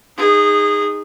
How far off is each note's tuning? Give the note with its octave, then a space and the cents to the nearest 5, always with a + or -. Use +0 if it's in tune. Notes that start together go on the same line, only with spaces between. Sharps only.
D#4 +0 G#4 -20